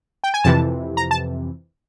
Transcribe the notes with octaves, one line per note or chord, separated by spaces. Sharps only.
G5
G#5
F2 C3 E3 A5
A#5
A5